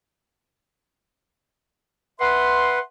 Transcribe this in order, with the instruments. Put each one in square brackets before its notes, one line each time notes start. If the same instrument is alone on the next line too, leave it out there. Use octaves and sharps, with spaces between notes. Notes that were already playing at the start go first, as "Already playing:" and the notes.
[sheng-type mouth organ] B4 [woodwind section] E5 F#5 C6